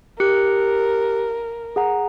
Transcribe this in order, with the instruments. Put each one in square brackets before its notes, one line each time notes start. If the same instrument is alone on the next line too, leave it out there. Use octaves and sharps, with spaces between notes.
[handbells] G4 F#6 C#7 [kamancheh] A#4
[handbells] G#4 F#5 A#5